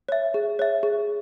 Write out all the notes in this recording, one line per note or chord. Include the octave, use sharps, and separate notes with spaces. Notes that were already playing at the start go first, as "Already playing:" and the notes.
C#5 E5
G#4
C#5 E5
G#4